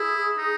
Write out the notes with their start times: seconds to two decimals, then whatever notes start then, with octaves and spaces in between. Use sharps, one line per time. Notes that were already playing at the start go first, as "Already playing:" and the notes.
Already playing: E4 G#4
0.38 D#4